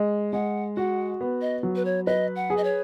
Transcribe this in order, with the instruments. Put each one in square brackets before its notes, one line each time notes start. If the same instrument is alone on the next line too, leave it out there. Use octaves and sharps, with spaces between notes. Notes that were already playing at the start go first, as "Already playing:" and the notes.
Already playing: [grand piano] G#3
[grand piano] G#3 [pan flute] F#5
[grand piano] F#4 [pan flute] F#5
[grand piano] B3
[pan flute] D#5
[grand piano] F#3
[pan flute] B4
C#5
[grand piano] B4 [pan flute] D#5
[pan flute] F#5
[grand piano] G#4
[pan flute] D#5
C#5